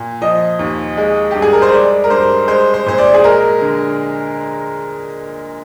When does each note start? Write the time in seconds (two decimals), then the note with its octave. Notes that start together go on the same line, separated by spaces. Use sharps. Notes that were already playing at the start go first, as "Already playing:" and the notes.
Already playing: A#2
0.22 F3 D#5
0.59 D#2
0.97 G#3
1.31 G2 G4
1.42 G#4
1.53 A#4
1.62 C5
1.72 G#3 D5
2.04 A#4
2.10 G2 C5
2.48 G#3 C5
2.74 C5
2.86 A#2 C5
2.98 D5
3.14 G#4
3.24 G#3 A#4
3.61 D3